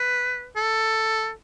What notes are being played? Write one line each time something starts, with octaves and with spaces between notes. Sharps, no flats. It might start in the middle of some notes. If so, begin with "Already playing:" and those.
Already playing: B4
A4